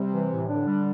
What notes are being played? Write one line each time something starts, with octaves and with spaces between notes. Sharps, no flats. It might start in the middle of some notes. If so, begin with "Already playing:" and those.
Already playing: C3 G3
E3
A2
D3 D4
G3